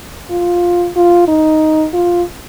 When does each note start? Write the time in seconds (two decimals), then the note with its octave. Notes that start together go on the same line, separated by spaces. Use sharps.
0.31 F4
0.96 F4
1.28 D#4
1.93 F4